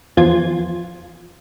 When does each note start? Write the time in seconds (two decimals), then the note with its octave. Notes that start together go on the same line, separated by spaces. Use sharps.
0.17 E2 F3 F4 G#6